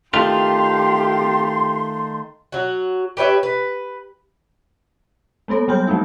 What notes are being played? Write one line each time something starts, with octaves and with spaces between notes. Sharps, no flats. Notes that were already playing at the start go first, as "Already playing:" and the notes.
D#3 A3 F4 G4 C6
F#3 F#4
G4 B4 C#5 E5
B4
G#3 A#3 B3 A4 C#5
F#3 G3 B3 G#5 F6 G6
F3 G#3 A#3 D4 D#4